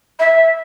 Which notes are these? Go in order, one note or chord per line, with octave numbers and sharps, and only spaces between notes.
E5